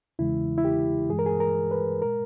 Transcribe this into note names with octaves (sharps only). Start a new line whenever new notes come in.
E2 C#3 E3 G#3 E4
E4
G4
G2 E3 G#3 G#4
A#4
G#4
A#4
B4
A#2 G#3 A#4